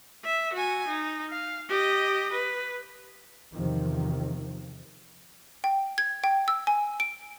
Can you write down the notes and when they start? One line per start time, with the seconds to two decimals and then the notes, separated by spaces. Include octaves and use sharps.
0.24 E5
0.53 F#4 G#5
0.87 D#4
1.29 F5
1.69 G4 D#5
2.32 B4
3.53 E2 C3 D#3 F3
5.64 G5
5.98 G#6
6.24 G5
6.48 E6
6.67 G#5
7.00 D7